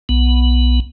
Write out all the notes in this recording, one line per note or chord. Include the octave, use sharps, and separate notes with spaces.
B1 B3